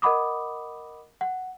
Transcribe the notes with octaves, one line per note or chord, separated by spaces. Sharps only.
A#4 D#5 F#5 B5 D6 D#6
F#5